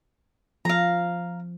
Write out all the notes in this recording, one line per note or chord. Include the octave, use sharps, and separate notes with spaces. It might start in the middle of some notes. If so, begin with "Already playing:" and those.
F3 F5 A#5